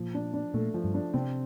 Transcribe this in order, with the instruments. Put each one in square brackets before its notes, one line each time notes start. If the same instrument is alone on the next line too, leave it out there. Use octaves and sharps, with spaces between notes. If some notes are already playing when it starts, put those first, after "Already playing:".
Already playing: [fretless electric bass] A#2 [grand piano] F3
[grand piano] D4
D4
[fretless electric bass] A#2 [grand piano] A3
[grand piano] F3
[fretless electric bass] G2
[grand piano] D4
[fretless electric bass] C3 [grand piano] C4